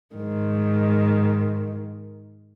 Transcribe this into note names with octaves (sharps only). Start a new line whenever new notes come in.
G#2 D#3